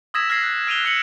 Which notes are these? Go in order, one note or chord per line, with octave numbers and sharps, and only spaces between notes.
D#6 E6 G#6 A#6 B6 E7
F6 G#6 A#6 C7
F#6
F6 D7 D#7 F7 G7
F#6 C#7 E7 F#7